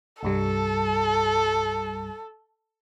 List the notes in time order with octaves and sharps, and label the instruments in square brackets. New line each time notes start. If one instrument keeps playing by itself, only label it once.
[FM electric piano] C2 G2 G3 [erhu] A4